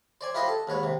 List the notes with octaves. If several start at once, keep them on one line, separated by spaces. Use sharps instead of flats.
C5 D5 G#5
E4 F4 G4 B4 C5 D#5
A4
D#2 G#2 B4 C#5
C3